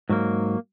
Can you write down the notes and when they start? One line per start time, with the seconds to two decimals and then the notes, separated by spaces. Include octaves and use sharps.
0.09 G#2 F#3 A#3